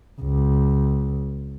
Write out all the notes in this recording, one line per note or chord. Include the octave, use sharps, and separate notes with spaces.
C#2